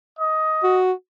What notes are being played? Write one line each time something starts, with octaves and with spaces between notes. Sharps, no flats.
D#5
F#4